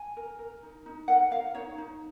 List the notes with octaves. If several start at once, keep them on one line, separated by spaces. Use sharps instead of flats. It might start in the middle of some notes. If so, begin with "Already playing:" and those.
Already playing: G#5
A#4
A#4
D#4
D#4
A#4 F#5
A#4 F5
D#4 C#5
D#4